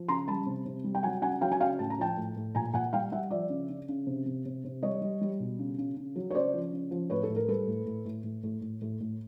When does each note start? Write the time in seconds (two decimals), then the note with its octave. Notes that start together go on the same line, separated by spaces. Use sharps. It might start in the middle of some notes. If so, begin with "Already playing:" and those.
Already playing: F3
0.08 C#3 A#5 C6
0.28 G3 A5 B5
0.46 C3
0.65 C3
0.84 G3
0.95 G5
1.03 F#3 F#5 G#5
1.22 C#3 F#5 G#5
1.41 F#3 F5 G5
1.52 G#5
1.60 C#3 F5 G5
1.79 A2 A5
1.90 A#5
1.99 F3 G5 A5
2.17 A2
2.37 A2
2.55 A#2 G#5 A#5
2.74 A#2 F#5 G#5
2.93 G3 F5 G5
3.12 G3 E5 F#5
3.31 F3 D5 E5
3.50 C#3
3.69 C#3
3.89 C#3
4.07 C3
4.26 C3
4.45 C3
4.64 C3
4.83 G3 C#5 D#5
5.02 G3
5.21 G3
5.40 B2
5.59 C#3
5.78 C#3
5.97 C#3
6.16 F#3
6.30 C#5
6.35 C#3 C5 D5
6.54 F3
6.73 C#3
6.91 F3
7.10 A2 B4 C#5
7.23 A4
7.29 A2
7.36 A#4
7.48 G3 A4 B4
7.68 A2
7.86 A2
8.05 A2
8.24 A2
8.43 A2
8.61 A2
8.82 A2
9.01 A2